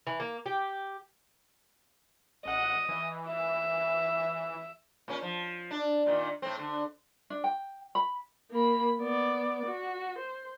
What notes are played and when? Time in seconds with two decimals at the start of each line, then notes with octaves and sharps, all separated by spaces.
0.07 E3
0.20 A#3
0.46 G4
2.45 A1 D#5 F#5
2.89 E3
3.29 E5
5.08 A#2 C#4
5.22 F3
5.71 D4
6.06 A#2 D#3
6.42 A2 C4
6.59 D3
7.30 D4
7.44 G5
7.95 B5
8.51 A#3 B5
9.00 B3 D5
9.66 F#4
10.18 C5